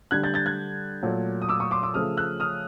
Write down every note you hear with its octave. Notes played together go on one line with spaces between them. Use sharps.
D3 G3 F#6 G#6
G6 A6
G6 A6
F#6 G#6
A#2 F#3 A3
D#6
D6 E6
C#6 D#6
C6 D6
D6 E6
C#3 F3 A3 D#6 F6
E6 F#6
D#6 F6